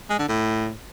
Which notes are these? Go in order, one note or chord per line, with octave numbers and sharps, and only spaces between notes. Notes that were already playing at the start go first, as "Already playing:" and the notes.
G#3
D3
A2